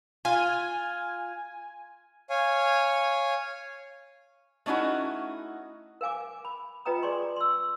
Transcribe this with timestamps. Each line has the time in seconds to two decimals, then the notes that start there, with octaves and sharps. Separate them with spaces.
0.25 F4 G#5
2.30 C#5 F5 G#5
4.66 A3 C#4 D#4 E4 F#4
6.01 A#4 F5 G#5 D6
6.45 B5
6.85 F4 B4 D#5 G5 A#5 D#6
7.03 G#4 D5 G#5 C6 C#6
7.36 C6 E6